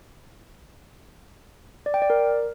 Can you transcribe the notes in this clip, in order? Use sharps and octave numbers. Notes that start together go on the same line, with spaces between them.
D5
G5
D5
A#4